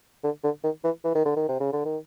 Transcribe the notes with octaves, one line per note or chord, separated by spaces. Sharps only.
D3
D3
D#3
E3
E3
D#3
D3
D#3
C3
C#3
D3
D#3